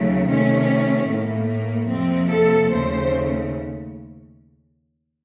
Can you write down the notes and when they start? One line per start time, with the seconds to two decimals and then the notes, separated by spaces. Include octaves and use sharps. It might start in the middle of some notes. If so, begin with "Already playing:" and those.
Already playing: D#2 C#3 F#3 A3
0.27 C3 D#3 A3 C#4
1.08 A2 A3 A#3
1.49 A#3
1.90 F2 C3 F3 A#3 C4
2.31 A4
2.71 D#2 C#3 A3 C5